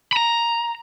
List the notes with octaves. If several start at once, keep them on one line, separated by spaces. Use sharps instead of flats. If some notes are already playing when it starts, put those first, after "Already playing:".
A#5 B5